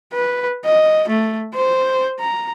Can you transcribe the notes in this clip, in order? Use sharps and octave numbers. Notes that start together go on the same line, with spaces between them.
B4
D#5
A3
C5
A#5